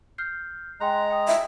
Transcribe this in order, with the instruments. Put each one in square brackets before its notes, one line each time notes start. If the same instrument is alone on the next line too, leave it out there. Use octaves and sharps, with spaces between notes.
[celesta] F6 G6 C7
[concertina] G#3 A#5 [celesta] G5 C6 F#6
[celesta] G5 D#6
[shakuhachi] E5